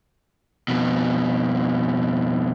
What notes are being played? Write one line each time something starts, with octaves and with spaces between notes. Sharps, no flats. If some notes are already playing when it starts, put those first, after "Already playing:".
F2 B2